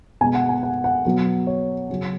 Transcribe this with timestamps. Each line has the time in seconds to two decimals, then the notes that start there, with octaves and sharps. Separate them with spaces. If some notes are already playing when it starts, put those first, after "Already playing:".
0.21 B2 G#3 B3 G#5
0.35 F#5
0.49 G#5
0.63 F#5
0.84 F#5
1.05 B2 F#3 B3
1.47 C#5
1.90 C#3 F#3 C#4